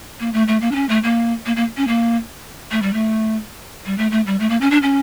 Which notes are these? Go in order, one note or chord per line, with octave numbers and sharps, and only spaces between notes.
A#3
A3
A3
A#3
D4
C#4
A3
A#3
A#3
A#3
C#4
A#3
A3
G3
A3
G3
A3
A3
G3
A3
A#3
C#4
D4
C#4